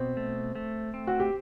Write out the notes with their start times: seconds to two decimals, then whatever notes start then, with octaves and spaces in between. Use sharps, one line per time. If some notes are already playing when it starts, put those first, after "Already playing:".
Already playing: B2 C4
0.17 A3
0.55 A3
0.94 C4
1.07 F#4
1.20 G4